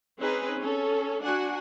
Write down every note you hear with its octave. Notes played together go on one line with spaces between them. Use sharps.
C4 C#4 D#4 G#4 B4
C#4 A4
D4 F#4 F#5 G#5